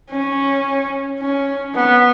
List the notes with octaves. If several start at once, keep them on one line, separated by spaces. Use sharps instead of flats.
C#4
C#4
B3